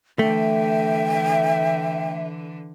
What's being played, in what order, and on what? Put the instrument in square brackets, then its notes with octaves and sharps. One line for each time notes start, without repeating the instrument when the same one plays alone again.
[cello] D3 E3 [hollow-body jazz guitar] A3 [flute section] E5 [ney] G5